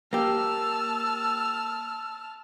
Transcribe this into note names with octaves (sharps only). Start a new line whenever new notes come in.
A#3 G4 A5 E6 F6